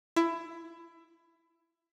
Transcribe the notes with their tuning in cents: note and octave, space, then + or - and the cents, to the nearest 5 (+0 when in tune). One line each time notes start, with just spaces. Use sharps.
E4 +20